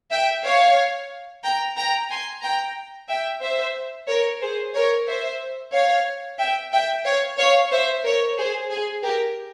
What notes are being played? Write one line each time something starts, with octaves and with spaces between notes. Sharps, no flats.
E5 G5
C#5 F5
G5 A#5
G5 A#5
G#5 C6
G5 A#5
E5 G5
C5 E5
A#4 C#5
G#4 C5
A#4 C#5
C5 E5
C#5 F5
E5 G5
E5 G5
C#5 F5
C#5 F5
C5 E5
A#4 C#5
G#4 C5
G#4
G4 A#4